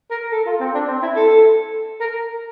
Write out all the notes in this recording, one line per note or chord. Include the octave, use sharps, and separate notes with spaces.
A#4
A4
F4
C4
D4
C4
E4
A4
A#4